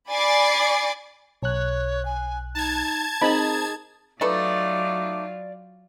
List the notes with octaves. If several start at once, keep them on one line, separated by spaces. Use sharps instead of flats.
D5 G#5 B5 D6 A6 C7
B1 C#5 F#6
G#5
D#4 A5 G#6
C4 D#4 G#4 D#5 B5
F#3 A3 D#4 F4 A4 B4 D5 D6